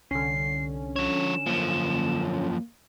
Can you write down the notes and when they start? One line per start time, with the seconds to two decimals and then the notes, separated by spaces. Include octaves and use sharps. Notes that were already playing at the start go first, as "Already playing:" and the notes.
0.11 C2 D3 C#4 C7
0.96 F3 C#5 E7
1.46 F#2 F3 A#3